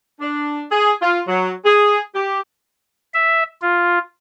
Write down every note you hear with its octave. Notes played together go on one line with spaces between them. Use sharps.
D4
G#4
F4
F#3
G#4
G4
E5
F4